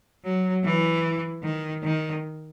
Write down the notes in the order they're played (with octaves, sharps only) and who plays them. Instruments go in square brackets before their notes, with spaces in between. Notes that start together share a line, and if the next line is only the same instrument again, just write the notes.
[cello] F#3
E3
D#3
D#3